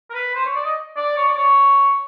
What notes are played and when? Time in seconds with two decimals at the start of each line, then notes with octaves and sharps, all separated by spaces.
0.10 A#4
0.14 B4
0.35 C5
0.46 C#5
0.55 D5
0.65 D#5
0.96 D5
1.16 C#5
1.28 D5
1.37 C#5